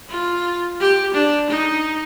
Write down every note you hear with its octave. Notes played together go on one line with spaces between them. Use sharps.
F4
G4
D4
D#4